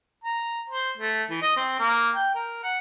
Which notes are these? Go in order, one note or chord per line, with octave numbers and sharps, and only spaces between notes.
A#5
C5
A3
E3
D#5
C4
A#3
G5
A#4
F#5